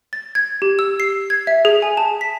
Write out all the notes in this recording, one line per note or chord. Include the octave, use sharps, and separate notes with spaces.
A6
G#6
G4
E6
C7
G#6
E5
G#4
G#5
A5
B6